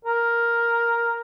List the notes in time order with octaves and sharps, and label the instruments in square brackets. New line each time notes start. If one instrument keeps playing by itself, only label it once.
[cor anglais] A#4